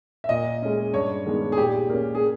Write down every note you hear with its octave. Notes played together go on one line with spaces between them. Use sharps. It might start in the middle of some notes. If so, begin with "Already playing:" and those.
E5
A#2 D#5
G#3 C#4
G2 C#5
D#3 G#3 B3
G#4
A#2 G4
A#3 C#4
G#4